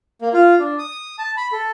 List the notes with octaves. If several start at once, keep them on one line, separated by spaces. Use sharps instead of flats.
A#3
F4
D4
D#6
A5
B5
A4